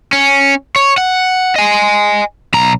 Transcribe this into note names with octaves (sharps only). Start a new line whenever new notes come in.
C#4
C#5
F#5
D#5 G#5
B1 A#5